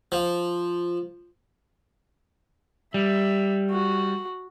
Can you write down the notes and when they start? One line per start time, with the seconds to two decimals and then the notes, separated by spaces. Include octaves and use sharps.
0.12 F3
2.94 G3 E5
3.71 F#4